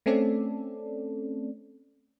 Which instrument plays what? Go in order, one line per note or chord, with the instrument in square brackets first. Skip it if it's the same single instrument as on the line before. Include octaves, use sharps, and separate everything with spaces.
[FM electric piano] A3 C4 C#4 A4 D5